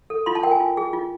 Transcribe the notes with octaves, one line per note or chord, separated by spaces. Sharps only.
A4
F4 C6
A5
A#4 G5
G#5
F4
G#4
F4